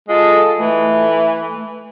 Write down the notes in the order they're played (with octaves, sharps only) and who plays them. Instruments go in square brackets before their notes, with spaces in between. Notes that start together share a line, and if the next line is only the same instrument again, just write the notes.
[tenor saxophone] G#3 [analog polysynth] F4 A4 A5
[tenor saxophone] E3 [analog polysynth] A3